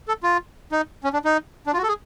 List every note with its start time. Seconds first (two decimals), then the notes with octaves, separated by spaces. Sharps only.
0.08 A4
0.23 F4
0.72 D#4
1.04 C#4
1.13 D4
1.25 D#4
1.66 D4
1.73 F4
1.77 F#4
1.83 A4
1.88 G#4